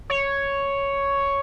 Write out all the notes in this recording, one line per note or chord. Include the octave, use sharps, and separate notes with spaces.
C#5